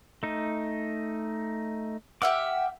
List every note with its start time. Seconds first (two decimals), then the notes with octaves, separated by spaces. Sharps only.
0.23 A3 D#4
2.22 G4 E5 F#5 D6 F6